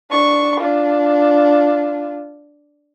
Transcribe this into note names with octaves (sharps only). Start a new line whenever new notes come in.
D4 C#6
D4 F4